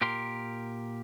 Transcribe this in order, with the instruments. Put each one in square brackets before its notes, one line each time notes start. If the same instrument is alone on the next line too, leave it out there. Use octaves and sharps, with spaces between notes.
[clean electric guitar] A#2 G4 A#4 C6